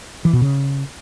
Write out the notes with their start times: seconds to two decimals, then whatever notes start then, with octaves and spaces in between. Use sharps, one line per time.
0.25 E3
0.33 B2
0.42 C#3